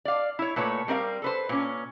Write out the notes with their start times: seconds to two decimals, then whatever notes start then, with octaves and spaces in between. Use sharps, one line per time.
0.05 D5 F5
0.39 E4 C#5
0.56 A#2 A3 B4 C#5
0.88 G3 C4 A#4 D#5 F5
1.22 A4 B4 C5
1.49 A#2 C#4